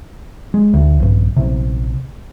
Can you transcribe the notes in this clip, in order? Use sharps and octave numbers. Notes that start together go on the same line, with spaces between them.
G#3
D2
A#1 G2
A#1 C3